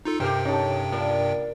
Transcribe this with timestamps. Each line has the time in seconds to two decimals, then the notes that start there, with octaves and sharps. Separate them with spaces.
0.05 D#4 F4 A4
0.20 G2 C3 G4 A#4 C5 G5
0.45 C#4 D#4 A4
0.92 A#3 D4 F4